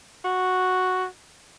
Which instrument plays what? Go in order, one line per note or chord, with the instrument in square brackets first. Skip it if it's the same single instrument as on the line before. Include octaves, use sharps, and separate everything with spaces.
[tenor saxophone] F#4